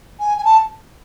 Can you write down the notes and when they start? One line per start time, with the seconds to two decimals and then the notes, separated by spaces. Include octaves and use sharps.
0.19 G#5
0.37 G#5
0.44 A5